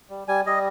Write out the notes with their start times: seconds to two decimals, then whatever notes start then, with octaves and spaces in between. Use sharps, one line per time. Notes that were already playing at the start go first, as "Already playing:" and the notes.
0.10 G3
0.28 G3 G#5
0.46 G3 D#5